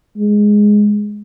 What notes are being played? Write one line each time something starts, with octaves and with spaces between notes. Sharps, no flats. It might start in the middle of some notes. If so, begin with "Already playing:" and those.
G#3